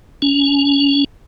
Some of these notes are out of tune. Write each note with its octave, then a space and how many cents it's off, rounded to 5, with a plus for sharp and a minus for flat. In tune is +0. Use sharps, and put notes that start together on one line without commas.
C#4 +25